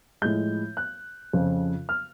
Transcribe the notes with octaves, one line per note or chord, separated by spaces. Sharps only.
A2 F3 G#3 G6
F#6
F2 C#3 F3
F6